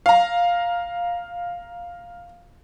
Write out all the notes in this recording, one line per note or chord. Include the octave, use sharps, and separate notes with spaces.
F5 A#5